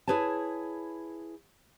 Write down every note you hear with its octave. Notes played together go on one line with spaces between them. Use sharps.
E4 G#4 B4 C#5 A5